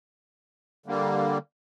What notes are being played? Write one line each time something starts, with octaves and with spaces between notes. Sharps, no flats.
D3 G3 A#3